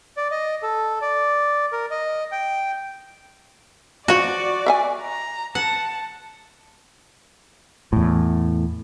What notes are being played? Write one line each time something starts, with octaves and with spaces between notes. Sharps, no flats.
D5
D#5
A4
D5
A#4
D#5
G5
F3 F4 F#4 D5
E5 F5 G#5
A#5
F#5 A5
E2 A2